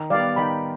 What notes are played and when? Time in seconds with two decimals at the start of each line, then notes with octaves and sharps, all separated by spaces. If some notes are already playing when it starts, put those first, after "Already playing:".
Already playing: D#3
0.10 G3 D5 F5
0.15 B3
0.36 D#3 G5 B5